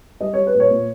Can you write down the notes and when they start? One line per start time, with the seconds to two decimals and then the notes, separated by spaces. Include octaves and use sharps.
0.21 G3 D#5
0.34 G3 C#5
0.47 B4
0.55 A#2
0.60 C#5
0.71 A#2